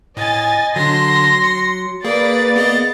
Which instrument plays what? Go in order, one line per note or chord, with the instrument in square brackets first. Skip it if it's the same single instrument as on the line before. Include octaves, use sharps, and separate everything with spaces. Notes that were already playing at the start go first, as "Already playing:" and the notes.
[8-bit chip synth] A2 [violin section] D#5 G#5 A6
[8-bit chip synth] D3 D4 [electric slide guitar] F#3 [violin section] C6 [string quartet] A#6
[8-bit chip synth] C#7
[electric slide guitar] A#3 [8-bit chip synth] G#4 [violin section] B4 D5 [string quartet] A6
[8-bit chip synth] B3 G#4 D#5